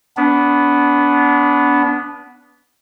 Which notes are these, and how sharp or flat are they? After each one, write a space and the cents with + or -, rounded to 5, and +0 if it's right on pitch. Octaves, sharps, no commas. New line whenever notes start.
B3 +0 D4 -30